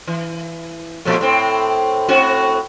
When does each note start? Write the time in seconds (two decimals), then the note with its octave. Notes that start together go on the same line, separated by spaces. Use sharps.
0.08 E3
1.05 A#2 F3 A3
1.21 A2 C4
2.08 A2 C4 F#4